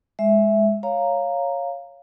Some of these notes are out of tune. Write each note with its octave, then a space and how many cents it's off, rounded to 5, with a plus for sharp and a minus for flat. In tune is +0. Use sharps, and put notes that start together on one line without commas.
G#3 +0 E5 +0
C#5 +0 F5 +0 A#5 +0